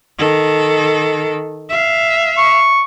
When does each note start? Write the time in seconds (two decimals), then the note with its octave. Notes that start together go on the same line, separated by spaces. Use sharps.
0.19 D#3 A4
1.70 E5 F5
2.37 C#6